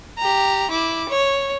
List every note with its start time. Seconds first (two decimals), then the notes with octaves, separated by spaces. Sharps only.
0.18 G4 A#5
0.71 E4 D6
1.09 C#5